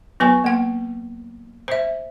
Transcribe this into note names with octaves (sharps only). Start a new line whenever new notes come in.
F#3 B3 B4 G#5 C#6
A#3 F#5
C5 E5